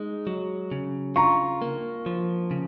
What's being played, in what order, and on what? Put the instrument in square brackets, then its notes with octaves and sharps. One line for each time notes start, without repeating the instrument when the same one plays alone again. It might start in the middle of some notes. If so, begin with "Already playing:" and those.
Already playing: [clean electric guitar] G#3 D#4
F#3
C#3
[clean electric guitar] F4 [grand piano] A#5 C#6
[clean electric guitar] A#3
F3
C#3